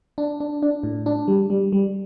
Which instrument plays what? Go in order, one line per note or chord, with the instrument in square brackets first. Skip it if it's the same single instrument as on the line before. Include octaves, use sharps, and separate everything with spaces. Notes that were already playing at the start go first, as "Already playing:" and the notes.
[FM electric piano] D4
D4
D4
A2
D4
G3
G3
G3